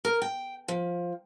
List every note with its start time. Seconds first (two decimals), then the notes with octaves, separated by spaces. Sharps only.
0.05 A#4
0.22 G5
0.68 F3